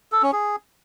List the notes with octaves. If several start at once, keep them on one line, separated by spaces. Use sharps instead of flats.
A4
C#4
G#4